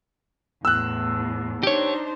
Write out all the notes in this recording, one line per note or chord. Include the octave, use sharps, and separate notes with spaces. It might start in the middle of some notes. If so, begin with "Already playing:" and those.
E2 A2 E6 F#6
D4 D#4 G4 C5 C#5